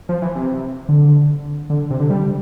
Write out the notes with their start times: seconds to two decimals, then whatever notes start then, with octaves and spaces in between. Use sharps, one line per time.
0.09 F3
0.22 E3
0.35 C3
0.89 D3
1.70 D3
1.91 C3
2.00 D3
2.10 G3